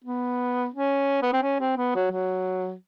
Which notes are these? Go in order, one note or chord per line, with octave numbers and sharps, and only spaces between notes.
B3
C#4
B3
C4
C#4
C4
B3
F#3
F#3